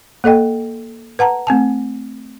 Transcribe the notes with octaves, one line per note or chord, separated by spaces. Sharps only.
A#3 A4 D#5 G5
B4 F#5 A5 A#5
A3 C4 G#5 A5